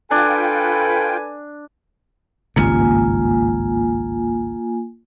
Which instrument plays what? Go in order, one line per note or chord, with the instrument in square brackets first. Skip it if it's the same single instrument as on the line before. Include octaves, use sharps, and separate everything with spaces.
[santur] D4 [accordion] F4 G5 [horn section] A4 B4 [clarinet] G#5
[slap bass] G#1 C#2 G2 [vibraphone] A#3 F4 G#5